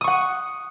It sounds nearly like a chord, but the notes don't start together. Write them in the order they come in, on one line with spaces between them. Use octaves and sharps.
D#6 C#6 F#5